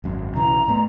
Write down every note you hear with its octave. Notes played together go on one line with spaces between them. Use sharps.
G#1 F#2
B1 C#3 E3 A#5
A2 A3 B3